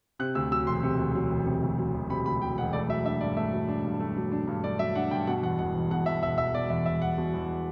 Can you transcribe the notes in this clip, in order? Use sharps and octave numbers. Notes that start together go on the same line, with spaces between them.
C3 F#6
D2 E6
F#3 E6
E1 C6
C3
D2
F#3
E1
C3
D2
F#3
E1
C3 B5
D2 B5
F#3 G5
E1 F#5
A3 D5
F#3 E5
D4 E5
G2 D5
A3 E5
F#3
D4
G2
A3
F#3
D4
G2
A3 D5
F#3 E5
D4 F#5
G2 G5
B2 F#5
E2 F#5
E1 F#5
E1
B2 F#5
E2 E5
E1 E5
E1 E5
B2 D5
E2 E5
E1 E5
E1 F#5
B2
E2